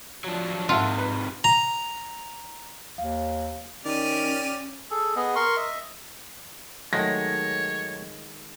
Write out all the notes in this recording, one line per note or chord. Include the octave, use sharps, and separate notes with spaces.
F3 F#3 D4
G#2 C3 D#3 F4 E5 F#5 A5
B4
A#5
D#2 F5
D#3 C#4 G4 D5 F6 D#7
G#4 A4
B3 G#4 D#5
A#4 C6 C#6
D#5 E5
D#3 F#3 G#3 A3 C#5 A#6